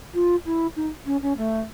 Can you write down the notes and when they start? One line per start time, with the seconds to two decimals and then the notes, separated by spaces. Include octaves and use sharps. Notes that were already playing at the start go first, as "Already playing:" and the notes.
0.14 F4
0.45 E4
0.76 D#4
1.06 C#4
1.22 C#4
1.37 A3